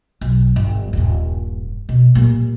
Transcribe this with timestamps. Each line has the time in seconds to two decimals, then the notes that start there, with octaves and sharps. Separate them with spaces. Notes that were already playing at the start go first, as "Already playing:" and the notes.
0.21 B1
0.56 G1
0.93 D#1 G2
1.89 B2
2.15 A#2 G3